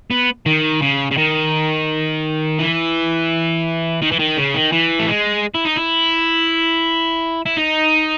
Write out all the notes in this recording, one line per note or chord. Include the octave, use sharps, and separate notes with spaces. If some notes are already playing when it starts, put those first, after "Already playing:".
B3
D#3
C#3
C#3
D#3
E3
D#3
E3
D#3
C#3
D#3
E3
A3
G#3
E4
D#4
E4
E4
D#4